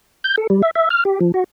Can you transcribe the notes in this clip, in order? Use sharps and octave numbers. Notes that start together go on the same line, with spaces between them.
G6
A4
G3
E5
E5
F6
G4
F3
F#4